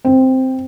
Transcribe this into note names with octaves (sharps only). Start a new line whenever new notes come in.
C4